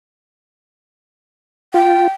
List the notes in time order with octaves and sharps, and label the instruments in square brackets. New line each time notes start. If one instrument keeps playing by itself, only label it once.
[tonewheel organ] F4 [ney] G5